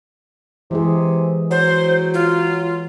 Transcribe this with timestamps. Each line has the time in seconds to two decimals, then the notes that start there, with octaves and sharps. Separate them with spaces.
0.71 C3 E3 G#3 G#4
1.51 F#3 C5
2.14 F4